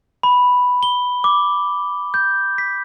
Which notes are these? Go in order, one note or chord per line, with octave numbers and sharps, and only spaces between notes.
B5
G7
D6
G6
B6